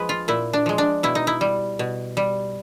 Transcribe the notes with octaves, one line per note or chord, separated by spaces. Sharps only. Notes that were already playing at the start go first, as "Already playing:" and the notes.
Already playing: F3 G#3 B4
F4
A#2 E4
D4
F3 G#3
D4
B2 E4
D#4
E4
G3
B2
G3